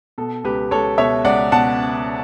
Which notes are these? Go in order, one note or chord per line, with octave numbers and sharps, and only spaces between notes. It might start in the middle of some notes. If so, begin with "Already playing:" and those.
B2 A4
C#2 G4 B4
C#2 A4 C#5
B2 C#5 E5
C#2 D5 F#5
B2 F#5 A5